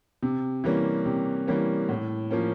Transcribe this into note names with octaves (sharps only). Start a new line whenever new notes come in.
C3
E3 G3 A#3 C#4
C3
E3 G3 A#3 C#4
A2
F3 A#3 C#4